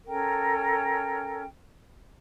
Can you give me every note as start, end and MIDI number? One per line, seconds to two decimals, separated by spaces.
0.06 1.44 61
0.06 1.44 69
0.06 1.44 70
0.06 1.44 79